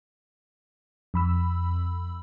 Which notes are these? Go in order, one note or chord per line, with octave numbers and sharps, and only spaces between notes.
F2 B5 E6